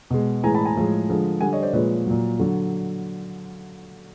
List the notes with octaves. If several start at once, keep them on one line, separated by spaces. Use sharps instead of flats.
B2 G#3
A2 E3 G#3 G#5 A#5
A5 B5
G#5 A#5
A2 F3 G#3
D3 F3 G#3
D3 G3 F#5 G#5
C#5 D#5
C5 D5
A#2 F3 G#3 B4 C#5
A#2 F#3
D3 F#3